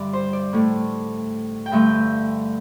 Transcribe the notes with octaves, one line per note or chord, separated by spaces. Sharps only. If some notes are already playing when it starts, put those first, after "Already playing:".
Already playing: G2 D3 G3 D5 E5
C5
D5
A2 A3
G5
G2 D3 A3 E5